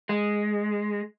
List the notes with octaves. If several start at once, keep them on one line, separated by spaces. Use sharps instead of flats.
G#3